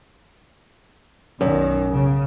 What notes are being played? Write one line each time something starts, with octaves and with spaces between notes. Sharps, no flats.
B1 F#2 D#3
C#3